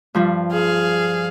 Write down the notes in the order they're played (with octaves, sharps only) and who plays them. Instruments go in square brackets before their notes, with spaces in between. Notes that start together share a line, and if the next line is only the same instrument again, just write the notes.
[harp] G2 F3 G3
[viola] G#4 F5